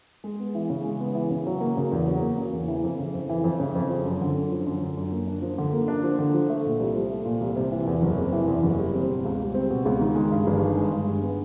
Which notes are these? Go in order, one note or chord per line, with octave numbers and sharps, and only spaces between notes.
G#3
B3
E3
C#3
G#3
B3
E3
C#3
F#3
A#3
C#3
E2
F#3
A#3
C#3
E2
E3
F2
C#3
F2
E3
F2
C#3
F2
F3
F#2
D3
F#2
F3
F#2
D3
F#2
A#3
D4
F3
D3
A#3
D4
F3
D3
F3
A3
A#2
C2
F3
A3
A#2
C2
C3
E3
E2
F#1
C3
E3
E2
F#1
G3
C4
B2
C#2
G3
C4
B2
C#2
D#3
G#3
G2
G1
D#3
G#3
G2
G1
B3